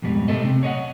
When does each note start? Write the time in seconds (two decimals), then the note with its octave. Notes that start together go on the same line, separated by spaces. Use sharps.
0.02 F2 G#2 B2 G3
0.28 A3 A4 C5 D#5
0.43 C3 C4
0.63 C#5 D#5 E5 F#5